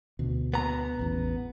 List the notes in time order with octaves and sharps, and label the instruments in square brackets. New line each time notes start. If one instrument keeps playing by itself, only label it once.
[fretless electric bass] D2 B2
[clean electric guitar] B3 A#5
[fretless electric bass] A1 E2